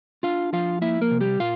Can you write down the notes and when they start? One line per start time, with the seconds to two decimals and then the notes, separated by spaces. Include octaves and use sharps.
0.23 D4 F4 F5
0.53 F3 F4 F5
0.81 A#3 E4 E5
1.01 A#3 A#4
1.11 C3
1.21 G3 G4
1.40 A#2 F4 F5